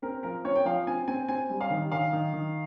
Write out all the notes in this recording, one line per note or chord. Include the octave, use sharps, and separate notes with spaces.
C4 A#4
F3 A#4
C4 C#5
G5
F3 F5
C4 G#5
C4 G#5
C4 G#5
G3
F5
D#3
D#3 F5
D#3
D#3